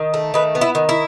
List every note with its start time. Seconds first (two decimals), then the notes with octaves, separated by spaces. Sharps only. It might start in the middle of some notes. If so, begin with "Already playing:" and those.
Already playing: D#3
0.14 A3
0.34 D#3 B4
0.55 B3
0.61 E4
0.75 D#3
0.89 E4